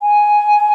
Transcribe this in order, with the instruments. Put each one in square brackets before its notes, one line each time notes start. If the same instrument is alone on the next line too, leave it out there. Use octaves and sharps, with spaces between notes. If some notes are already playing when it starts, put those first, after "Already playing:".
[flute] G#5